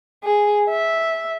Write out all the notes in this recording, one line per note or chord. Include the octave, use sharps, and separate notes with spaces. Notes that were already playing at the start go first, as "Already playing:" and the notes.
G#4
E5